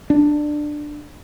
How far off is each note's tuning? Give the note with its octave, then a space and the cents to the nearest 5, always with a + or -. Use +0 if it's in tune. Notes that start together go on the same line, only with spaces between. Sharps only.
D4 +15